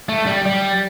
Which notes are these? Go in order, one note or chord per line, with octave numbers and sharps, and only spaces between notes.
A3
G3
G3